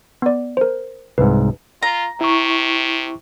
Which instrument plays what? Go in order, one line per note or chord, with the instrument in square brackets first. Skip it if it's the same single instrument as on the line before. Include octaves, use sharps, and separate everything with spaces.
[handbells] B3 D5
A#4 C5
[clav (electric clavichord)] C2 G#2 [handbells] B4
[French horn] F4 [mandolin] A#5
[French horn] C3 [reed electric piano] E4 C#6